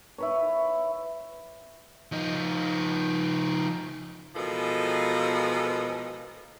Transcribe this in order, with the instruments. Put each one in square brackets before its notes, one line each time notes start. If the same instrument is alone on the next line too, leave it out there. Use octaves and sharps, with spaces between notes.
[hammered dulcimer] E4 B4 C#5
[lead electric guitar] F3 D#4
[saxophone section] B2 E3 F3 G#3 A4 A#4